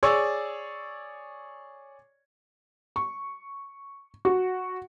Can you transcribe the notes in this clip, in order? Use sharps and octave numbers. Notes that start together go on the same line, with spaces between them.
G#4 C#5 D5 C#6 E6
C#6
F#4